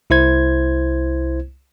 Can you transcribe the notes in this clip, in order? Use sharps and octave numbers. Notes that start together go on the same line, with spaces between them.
C2 E4 C5 G#6